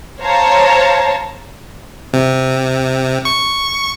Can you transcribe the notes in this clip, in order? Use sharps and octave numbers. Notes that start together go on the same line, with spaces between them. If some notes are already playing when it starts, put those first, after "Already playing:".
C5 C#5 F5 A5 A#5
C3
C#6